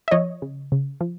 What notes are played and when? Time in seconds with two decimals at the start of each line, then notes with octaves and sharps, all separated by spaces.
0.08 E5
0.11 F3 C#5 D#5
0.42 C#3
0.72 C#3
1.01 F3